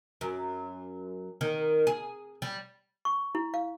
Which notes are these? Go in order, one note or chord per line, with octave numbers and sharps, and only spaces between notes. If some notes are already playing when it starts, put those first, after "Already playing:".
F#2
D#3
G#4
G3
C#6
E4
F5